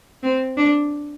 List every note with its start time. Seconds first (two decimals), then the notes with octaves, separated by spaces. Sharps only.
0.23 C4
0.57 D4